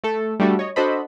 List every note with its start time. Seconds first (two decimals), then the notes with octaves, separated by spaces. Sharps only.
0.04 A3 A4
0.40 G3 A3 D4 F#4 A4
0.59 C#5 D#5
0.76 D4 F#4 A4 C5 D#5 B5